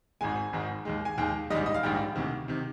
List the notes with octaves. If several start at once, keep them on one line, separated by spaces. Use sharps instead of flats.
G#1 G#2 D#3 G#3 G#5
G#1 G#2 D#3 G#3
D#2 D#3 G#3
G#5
D#2 D#3 G#3 G5
A#1 G#2 D#3 G3 D#5
D#5
F5
A#1 G#2 D#3 G3 G5
D2 C3 D#3
C3 D#3